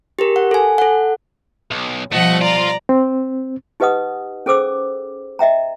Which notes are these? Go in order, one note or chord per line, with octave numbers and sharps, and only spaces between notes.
G4 G#4 A#4
F#5
A4 G#5
A4 F#5
B1
B2 F3 G3 A3 D#5 F#5
F4 D5 A#5
C4
D#4 G4 B4 D#5 F#5 D#6
C#4 G#4 A4 C5 D6 E6
D#5 E5 G5 A#5